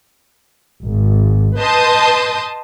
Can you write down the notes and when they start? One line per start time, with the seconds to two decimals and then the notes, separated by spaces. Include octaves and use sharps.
0.83 G#1
1.58 B4 D#5 A5 C6 D#6 G6